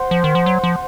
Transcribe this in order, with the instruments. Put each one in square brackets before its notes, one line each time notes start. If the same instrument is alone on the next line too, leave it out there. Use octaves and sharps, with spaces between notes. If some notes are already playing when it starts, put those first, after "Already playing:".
Already playing: [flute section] C5 F#5 C6
[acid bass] F3
D#3
F3
F#3
F3